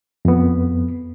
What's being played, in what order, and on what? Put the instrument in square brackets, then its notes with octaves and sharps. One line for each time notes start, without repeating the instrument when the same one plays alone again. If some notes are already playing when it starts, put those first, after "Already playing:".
[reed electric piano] F2 B3